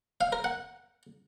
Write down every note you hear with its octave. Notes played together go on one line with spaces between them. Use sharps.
F5
A#4
F#5